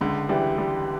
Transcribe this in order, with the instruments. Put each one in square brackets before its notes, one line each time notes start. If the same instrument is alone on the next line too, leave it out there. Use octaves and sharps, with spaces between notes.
[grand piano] C#2 [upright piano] D3
[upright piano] E3 [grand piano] G3
[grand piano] G3